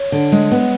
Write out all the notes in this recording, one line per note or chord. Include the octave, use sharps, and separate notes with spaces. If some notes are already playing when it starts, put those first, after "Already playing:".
Already playing: C#5
D3
G#3
B3